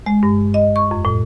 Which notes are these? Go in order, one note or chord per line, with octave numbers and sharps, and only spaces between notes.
G#3
G2
D#5
C#6
F2
A2